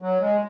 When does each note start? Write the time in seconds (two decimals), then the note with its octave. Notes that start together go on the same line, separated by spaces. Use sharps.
0.02 F#3
0.20 G#3